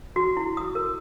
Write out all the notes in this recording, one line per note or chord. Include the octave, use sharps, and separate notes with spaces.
F#4
E4
D#6
A#4